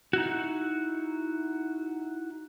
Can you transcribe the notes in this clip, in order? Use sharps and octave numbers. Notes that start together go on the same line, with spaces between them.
D#4 E4 F#4